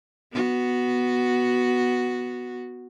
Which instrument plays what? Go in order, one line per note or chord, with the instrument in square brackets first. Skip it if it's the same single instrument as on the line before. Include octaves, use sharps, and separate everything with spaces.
[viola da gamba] B3 F#4